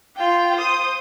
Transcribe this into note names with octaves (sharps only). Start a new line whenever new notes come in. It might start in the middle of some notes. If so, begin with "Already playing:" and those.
F4 G5
C5 D#6